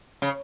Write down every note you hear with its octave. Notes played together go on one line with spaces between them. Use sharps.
C#3